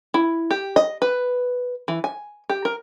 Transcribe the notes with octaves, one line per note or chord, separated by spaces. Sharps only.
E4
G4
D#5
B4
E3
G#5
G4
A#4